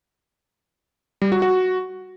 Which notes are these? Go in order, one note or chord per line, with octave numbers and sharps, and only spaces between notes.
G3
F#4
F#4